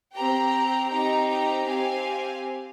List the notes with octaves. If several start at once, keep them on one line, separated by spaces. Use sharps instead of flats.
C4 G4 G5 A#5
C4 D#4 G4 G5 A#5
G5 A#5
C4 G4 F5 G#5